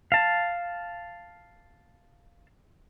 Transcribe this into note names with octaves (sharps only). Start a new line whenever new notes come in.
F5 A5